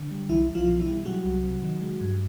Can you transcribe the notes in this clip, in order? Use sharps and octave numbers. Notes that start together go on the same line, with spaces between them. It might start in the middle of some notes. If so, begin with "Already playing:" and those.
Already playing: D3
G3
B1 E3 E4
B1
F3 F4
B2
E3 E4
G3
F#3 G3 F#4
C2
C3
D#3
G#3
G2